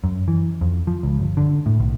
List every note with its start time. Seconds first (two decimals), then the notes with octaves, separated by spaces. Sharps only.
0.04 F#2
0.28 E3
0.61 F2
0.87 F3
1.03 C#2
1.19 G1
1.37 D3
1.66 A2
1.80 B1